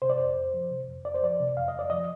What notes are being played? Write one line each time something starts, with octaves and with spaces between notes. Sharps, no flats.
C3 C5
D5
F2 C5
F2
F3
C3
F2
F2 D5
C5
F3 D5
C3
F2 F5
D#5
F2 D5
F3 D#5